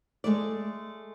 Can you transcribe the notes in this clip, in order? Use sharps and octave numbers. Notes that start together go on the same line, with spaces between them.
G#3 A3 D5